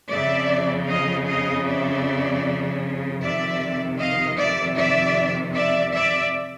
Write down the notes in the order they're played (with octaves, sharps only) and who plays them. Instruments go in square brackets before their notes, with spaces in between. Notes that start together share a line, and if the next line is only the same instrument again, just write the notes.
[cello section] F2 C#3 F3 D5 E5
D#5 F5
D#5 F5
D5 E5
F2 C3 D#3 D5 E5
D#5 F5
D5 E5
D5 E5
D5 E5
D5 E5